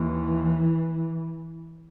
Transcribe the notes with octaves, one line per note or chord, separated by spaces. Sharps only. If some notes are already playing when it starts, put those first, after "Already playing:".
Already playing: D#2 E3